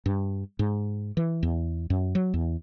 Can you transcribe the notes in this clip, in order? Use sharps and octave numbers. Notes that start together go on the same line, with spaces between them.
G2
G#2
E3
E2
F#2
F#3
E2